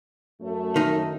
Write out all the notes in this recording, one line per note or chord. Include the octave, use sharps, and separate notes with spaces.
F#2 A3
D#3 D#4